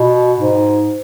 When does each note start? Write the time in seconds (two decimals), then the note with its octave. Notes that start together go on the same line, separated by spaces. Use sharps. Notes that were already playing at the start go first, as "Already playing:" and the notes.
Already playing: B2
0.38 G#2